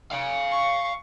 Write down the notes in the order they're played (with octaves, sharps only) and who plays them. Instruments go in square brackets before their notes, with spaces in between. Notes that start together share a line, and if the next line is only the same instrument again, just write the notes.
[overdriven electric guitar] F5 G#5
[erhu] C#6